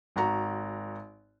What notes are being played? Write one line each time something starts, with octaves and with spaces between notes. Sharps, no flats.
G#1 F#4 A#5